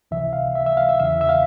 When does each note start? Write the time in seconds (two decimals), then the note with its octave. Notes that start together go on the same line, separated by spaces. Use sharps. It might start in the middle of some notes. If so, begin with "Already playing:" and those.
0.11 C#2 C3 E3 E5
0.33 F5
0.55 E5
0.66 E5
0.77 F5
0.89 E5
1.00 E2 C#3 E3 E5
1.21 E5
1.29 F5